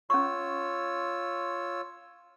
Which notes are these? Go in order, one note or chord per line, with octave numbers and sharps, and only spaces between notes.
C#4 F4 C#5 C#6 E6